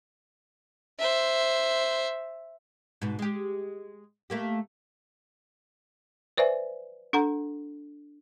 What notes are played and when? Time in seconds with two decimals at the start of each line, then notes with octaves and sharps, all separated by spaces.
0.99 C5 E5
3.02 G#2 B2
3.19 G#3 G4
4.30 A3 A#3 G4
6.37 B4 C5 D5 E5 G#5
7.13 D4 A4 F#5 A#5